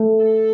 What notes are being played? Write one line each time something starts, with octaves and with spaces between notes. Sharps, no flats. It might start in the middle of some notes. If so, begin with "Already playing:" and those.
Already playing: A3
A4